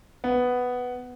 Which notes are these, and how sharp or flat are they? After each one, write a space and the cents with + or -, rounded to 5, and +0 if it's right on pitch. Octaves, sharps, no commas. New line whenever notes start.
B3 +5